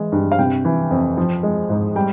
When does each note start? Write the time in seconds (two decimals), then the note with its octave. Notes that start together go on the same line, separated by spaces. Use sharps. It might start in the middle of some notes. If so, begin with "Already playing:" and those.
Already playing: E3 G#3
0.12 G2
0.32 F5
0.39 C3 G5
0.65 E3
0.91 F2
1.17 F3
1.43 G#3
1.70 G#2
1.96 G3 G5